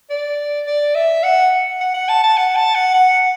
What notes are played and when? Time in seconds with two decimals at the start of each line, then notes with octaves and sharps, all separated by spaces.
0.10 D5
0.66 D5
0.95 E5
1.23 F#5
1.81 F#5
1.94 F#5
2.09 A5
2.23 A5
2.37 F#5
2.56 A5
2.75 F#5
2.94 F#5